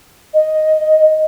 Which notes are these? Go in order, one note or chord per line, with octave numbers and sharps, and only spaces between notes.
D#5